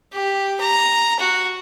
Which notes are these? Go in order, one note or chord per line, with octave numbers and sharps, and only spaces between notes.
G4
A#5
F#4